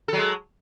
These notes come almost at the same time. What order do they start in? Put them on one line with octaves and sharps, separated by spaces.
A4 F#3 G#3